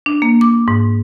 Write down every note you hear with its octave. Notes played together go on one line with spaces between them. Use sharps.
D4
A#3
D6
G#2